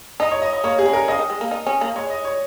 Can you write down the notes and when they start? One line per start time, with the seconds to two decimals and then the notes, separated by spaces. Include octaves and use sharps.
0.20 D#4 D#5
0.31 C#5
0.42 D#5
0.53 D#5
0.64 A#3 C#5
0.79 G#4
0.86 C#3
0.93 A#4
1.08 C#3 D#5
1.19 D#3
1.30 G#3
1.41 A#3
1.51 D#4
1.67 C#4
1.81 A#3
1.96 G#3 C#5
2.10 D#5
2.25 C#5